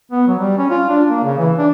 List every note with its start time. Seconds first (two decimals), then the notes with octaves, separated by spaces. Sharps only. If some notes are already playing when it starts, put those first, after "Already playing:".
0.12 B3
0.28 F#3
0.39 G3
0.58 C#4
0.70 F4
0.90 D4
1.08 A#3
1.24 C#3
1.38 E3
1.58 D4